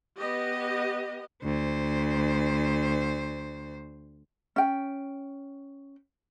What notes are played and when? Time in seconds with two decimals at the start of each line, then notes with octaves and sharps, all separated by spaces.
0.18 B3 G4 D#5
1.44 D2 C5
4.56 C#4 G5